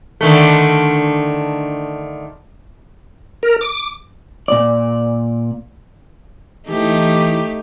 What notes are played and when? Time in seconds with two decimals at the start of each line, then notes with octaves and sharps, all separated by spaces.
0.21 D3 D#3 A3
3.43 A#4
3.61 D6
4.48 A#2 D5
6.68 E3 A3 D#4 G4